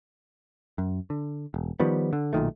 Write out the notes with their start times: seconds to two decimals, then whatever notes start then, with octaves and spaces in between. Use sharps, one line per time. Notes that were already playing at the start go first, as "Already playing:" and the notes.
0.78 F#2
1.10 D3
1.54 E1
1.80 D#3 F3 G3 B3
2.13 D3
2.33 B1 A#2 D#3 A3